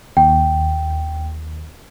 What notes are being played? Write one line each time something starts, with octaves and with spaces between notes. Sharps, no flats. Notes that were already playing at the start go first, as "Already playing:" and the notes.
D#2 G5